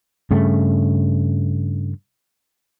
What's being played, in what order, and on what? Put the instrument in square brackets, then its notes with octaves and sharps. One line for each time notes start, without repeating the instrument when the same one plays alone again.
[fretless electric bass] G2 C#3 A3